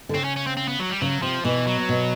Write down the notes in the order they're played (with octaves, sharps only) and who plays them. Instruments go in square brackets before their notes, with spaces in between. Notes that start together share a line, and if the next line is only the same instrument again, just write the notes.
[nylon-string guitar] D3
[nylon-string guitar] C#3 [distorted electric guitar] C4
[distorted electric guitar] C#4
C#4
C4
C4
B3
F#3
G3
[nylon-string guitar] C#3 [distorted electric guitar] F#3
[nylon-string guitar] C3 [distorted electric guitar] F3
[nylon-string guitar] B2 [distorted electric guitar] E3
[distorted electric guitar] F#3
[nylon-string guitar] B2